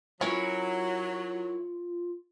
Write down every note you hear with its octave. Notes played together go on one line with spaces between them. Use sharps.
F#3 C#4 E4 F4 A#4 C#5